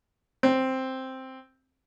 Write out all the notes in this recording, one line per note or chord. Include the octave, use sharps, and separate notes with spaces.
C4